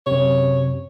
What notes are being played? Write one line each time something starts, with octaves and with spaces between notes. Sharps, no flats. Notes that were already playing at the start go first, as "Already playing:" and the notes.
F#2 C3 C#5